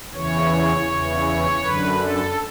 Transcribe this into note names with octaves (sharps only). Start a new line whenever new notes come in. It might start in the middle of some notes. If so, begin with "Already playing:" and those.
E2 C#3 E3 C#5
E2 C#3 E3
F#2 D3 B4
A4